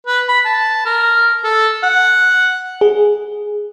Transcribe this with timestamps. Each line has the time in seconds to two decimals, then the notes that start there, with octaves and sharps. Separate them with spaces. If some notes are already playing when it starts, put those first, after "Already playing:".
0.07 B4
0.28 B5
0.45 A5
0.86 A#4
1.44 A4
1.83 F#5
2.81 G#4